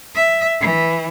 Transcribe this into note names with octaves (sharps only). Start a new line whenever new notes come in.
E5
E3